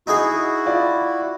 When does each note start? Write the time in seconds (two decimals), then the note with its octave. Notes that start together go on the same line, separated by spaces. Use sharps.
0.07 D#4 E4 F#4 G#4
0.66 F4 D5